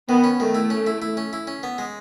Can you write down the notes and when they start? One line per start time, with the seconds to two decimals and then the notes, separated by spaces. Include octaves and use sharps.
0.09 D#3 B3
0.24 C#4
0.40 D#3 A3
0.55 E4
0.70 C#4
0.87 E4
1.02 E4
1.17 C#4
1.33 E4
1.47 C#4
1.63 B3
1.78 G#3